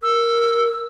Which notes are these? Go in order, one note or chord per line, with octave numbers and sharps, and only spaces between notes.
A#4 E6